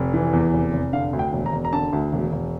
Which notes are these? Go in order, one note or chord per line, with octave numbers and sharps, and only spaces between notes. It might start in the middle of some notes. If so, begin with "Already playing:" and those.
Already playing: F1
E3
E2
F1
F1
D3 F5
D2
G5
E1
A#5
E1
A#5
D3 A5
D2
E1
E1